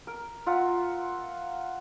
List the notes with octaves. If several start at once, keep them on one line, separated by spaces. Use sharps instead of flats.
A#4
F4 E5 F#5 A#5